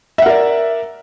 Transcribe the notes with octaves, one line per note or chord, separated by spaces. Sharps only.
A#4 D5 E5 F#5